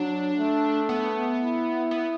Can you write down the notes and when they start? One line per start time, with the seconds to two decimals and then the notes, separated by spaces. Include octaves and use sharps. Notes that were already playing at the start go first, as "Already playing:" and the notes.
Already playing: F#3 D4
0.38 A3
0.89 B3
1.41 E4
1.91 B3